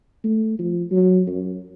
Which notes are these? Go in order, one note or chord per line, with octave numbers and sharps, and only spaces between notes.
A3
F3
F#3
F#2